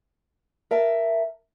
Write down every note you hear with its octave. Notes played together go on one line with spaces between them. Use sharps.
A#4 E5 A5